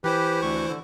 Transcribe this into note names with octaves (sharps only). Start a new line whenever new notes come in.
E3 E4 G4 B4 C5
D2 C#6
D3